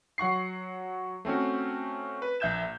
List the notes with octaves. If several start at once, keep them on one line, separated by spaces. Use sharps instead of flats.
F#3 F#5 C#6 C7
A3 C4 C#4 F#4
B4
A#1 E5 G6 G#6 E7